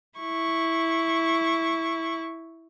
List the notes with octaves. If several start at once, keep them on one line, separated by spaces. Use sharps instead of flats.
E4 C#6